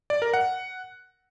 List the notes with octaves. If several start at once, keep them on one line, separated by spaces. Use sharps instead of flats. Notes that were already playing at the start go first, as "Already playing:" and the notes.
D5
A#4
F#5